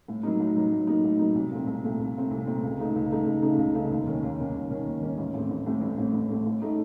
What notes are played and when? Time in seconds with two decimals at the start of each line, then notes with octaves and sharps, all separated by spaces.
0.08 A2
0.23 F#3 A#3 D#4
0.40 A2
0.56 F#3 A#3 D#4
0.72 A2
0.87 F#3 A#3 D#4
1.04 A2
1.19 F#3 A#3 D#4
1.35 C2
1.51 A#2 A3 C4
1.67 C2
1.84 A#2 A3 C4
2.00 C2
2.16 A#2 A3 C4
2.31 C2
2.47 A#2 A3 C4
2.63 C#2
2.79 C#3 A3 D#4
2.95 C#2
3.11 C#3 A3 D#4
3.26 C#2
3.42 C#3 A3 D#4
3.58 C#2
3.75 C#3 A3 D#4
3.90 D#2
4.07 D#3 A#3 C#4
4.23 D#2
4.38 D#3 A#3 C#4
4.54 D#2
4.70 D#3 A#3 C#4
4.86 D#2
5.02 D#3 A#3 C#4
5.18 A1
5.34 A2 A3 C4
5.50 A1
5.66 A2 A3 C4
5.81 A1
5.98 A2 A3 C4
6.13 A1
6.30 A2 A3 C4
6.46 A2
6.62 A3 D#4